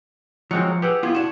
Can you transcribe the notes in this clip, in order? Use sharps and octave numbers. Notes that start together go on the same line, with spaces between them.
F3 F#3 G#3 C4 C#7
G4 G#4 B4 F#5 E6
B3 E4 F4 G#6
D4 F#4 E7